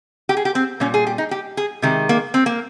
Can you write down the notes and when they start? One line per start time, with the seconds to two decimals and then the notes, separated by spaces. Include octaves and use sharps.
0.29 G4
0.37 G#4
0.45 G4
0.55 C4
0.80 A#2 G3 C#4
0.94 G#4
1.07 G4
1.18 D#4
1.31 G4
1.57 G#4
1.82 C3 D#3 G#3 G4
2.09 A#3
2.34 C4
2.46 A#3